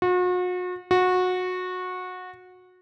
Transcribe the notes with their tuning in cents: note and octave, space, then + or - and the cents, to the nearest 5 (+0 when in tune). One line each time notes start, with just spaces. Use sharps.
F#4 -40
F#4 -20